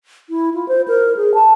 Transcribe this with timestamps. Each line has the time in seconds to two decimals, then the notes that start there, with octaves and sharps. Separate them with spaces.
0.30 E4
0.54 F4
0.68 C5
0.88 A#4
1.17 G#4
1.34 A5